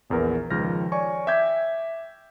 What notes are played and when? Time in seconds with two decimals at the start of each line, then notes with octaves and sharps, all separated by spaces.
0.10 A#1 E2 B3 A#4
0.50 C#2 D#3 F3 F6 G6 A#6
0.92 C#5 D5 G#5 C#6
1.27 E5 G5 D6 G6 G#6 B6